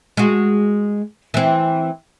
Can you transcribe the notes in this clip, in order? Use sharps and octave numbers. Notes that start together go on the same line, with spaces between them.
G#3 F#4
E3 C4